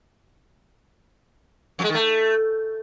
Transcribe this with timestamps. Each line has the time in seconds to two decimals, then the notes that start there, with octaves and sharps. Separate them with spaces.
1.79 F2
1.84 G#3
1.89 D#3
1.95 A3